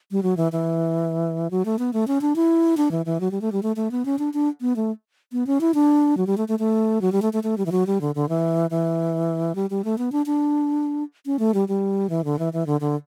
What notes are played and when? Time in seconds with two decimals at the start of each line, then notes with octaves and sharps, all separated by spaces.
0.11 G3
0.23 F#3
0.37 E3
0.52 E3
1.51 F#3
1.65 A3
1.79 B3
1.93 A3
2.07 C#4
2.21 D4
2.36 E4
2.77 D4
2.91 E3
3.06 E3
3.20 F#3
3.31 G3
3.41 A3
3.52 G3
3.63 A3
3.76 A3
3.91 B3
4.05 C#4
4.19 D4
4.34 D4
4.61 B3
4.76 A3
5.32 B3
5.47 C#4
5.61 E4
5.74 D4
6.17 F#3
6.27 G3
6.38 A3
6.48 A3
6.59 A3
7.01 F#3
7.12 G3
7.22 A3
7.33 A3
7.43 A3
7.58 G3
7.66 E3
7.72 F#3
7.87 G3
8.01 D3
8.15 D3
8.29 E3
8.70 E3
9.55 G3
9.70 G3
9.84 A3
9.98 B3
10.12 D4
10.26 D4
11.26 C#4
11.39 A3
11.54 G3
11.68 G3
12.10 E3
12.24 D3
12.39 E3
12.53 E3
12.66 D3
12.81 D3